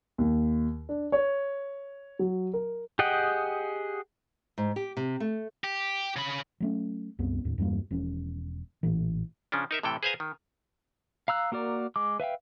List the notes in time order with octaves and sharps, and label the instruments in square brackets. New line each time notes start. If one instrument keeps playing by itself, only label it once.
[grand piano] D#2
D4
C#5
F#3
A#4
[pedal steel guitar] G4 G#4 D#5 F#5 G5
[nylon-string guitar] G#2
G4
C3
A3
[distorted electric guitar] G4
C#3 B5
[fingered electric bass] F#3 A3 C#4
C2 F#2 B3 C4
D#2 A2
E2 G2 G3 A#3
E1 F3 C#4
A1 A#2 E3
[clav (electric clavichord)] C#3 F3 C#4 D4
D#4 A#4 E5
A2 C3 E3 A4 G5
G#4 B4 C5 F5 G#5 A#5
D#3
[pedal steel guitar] F5 A#5 E6 F#6
A#3 F#4 A#4 D5
G#3 D6
B4 E5 F5 G5